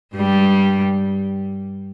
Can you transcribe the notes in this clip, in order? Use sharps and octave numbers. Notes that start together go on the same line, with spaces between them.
G2 G3